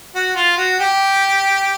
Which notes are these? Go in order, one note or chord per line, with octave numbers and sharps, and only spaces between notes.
F#4
F4
F#4
G4